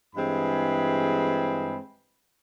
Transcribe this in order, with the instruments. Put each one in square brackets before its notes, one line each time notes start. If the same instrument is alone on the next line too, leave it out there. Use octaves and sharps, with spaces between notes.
[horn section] G2 E3 G#3 C4 G#4 B5